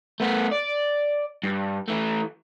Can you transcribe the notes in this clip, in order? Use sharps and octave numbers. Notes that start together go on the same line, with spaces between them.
A3 B3
D5
G2
E3 A3